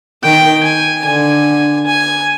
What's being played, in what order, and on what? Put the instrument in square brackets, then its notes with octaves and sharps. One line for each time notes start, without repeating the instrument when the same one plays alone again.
[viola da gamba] D#3 [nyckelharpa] G5
[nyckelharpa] G#5
[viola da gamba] D3 [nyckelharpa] G#5
[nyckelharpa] G#5